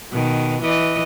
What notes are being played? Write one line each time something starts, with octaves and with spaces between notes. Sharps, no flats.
B2 D#3
E3 D#5